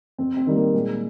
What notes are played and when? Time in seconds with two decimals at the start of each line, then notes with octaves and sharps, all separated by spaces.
0.18 F2 C4
0.37 C4
0.47 D#3 G3
0.55 A#3
0.74 A#2 G#3